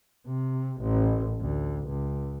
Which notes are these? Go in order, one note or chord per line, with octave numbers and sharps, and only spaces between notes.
C3
A1
D2
C#2